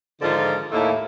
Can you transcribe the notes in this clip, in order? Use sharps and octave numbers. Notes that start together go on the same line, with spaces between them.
G#2 D3 D#3 F3 F4
D#2 A2 D#3 A3 A#3 E4